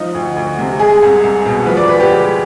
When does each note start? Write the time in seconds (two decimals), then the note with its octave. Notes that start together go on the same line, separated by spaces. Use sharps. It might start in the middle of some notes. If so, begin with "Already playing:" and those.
Already playing: F3 D#4
0.15 D2
0.36 D2
0.59 C3
0.79 G#3 G#4
1.02 C2
1.24 C2
1.46 B2
1.66 F3 B4
1.77 D5
1.88 D2 B4
2.00 G4
2.10 G#3